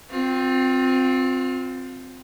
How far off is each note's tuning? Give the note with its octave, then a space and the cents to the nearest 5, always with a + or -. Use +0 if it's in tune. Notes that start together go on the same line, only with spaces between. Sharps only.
C4 -5 F4 +30